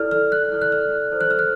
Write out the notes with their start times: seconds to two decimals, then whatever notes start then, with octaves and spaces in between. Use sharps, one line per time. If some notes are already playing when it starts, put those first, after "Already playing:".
Already playing: E4 A4 D5 F6
0.11 F6
0.32 F#6
0.52 E4 A4 D5
0.62 F#6
0.72 F6
1.12 E4 A4 C5
1.21 F#6
1.31 F6
1.39 F#6